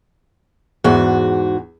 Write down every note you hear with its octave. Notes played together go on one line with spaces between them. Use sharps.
E2 G#2 F#4